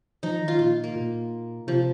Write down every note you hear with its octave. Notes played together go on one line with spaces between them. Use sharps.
F3 D#4
D#3
F4
A#2 F4
A#3
A#2
C3 F3